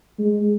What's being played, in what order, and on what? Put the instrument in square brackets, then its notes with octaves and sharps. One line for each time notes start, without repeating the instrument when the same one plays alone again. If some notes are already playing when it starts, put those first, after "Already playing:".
[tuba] G#3